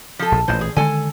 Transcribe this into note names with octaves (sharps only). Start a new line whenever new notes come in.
F3 A4
A#1
A1 A#2 E3 C5
G#4
D3 D#3 G#3 A4 G#5